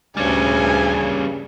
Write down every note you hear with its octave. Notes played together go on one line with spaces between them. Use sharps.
D2 G2 C#3 G3 C#4 G#5